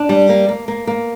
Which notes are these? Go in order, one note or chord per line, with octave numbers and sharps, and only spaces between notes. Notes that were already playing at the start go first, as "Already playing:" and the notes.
Already playing: D4
G3
A#3
A#3
A#3
A#3